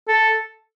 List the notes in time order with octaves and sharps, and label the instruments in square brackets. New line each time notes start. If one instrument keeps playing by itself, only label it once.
[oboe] A4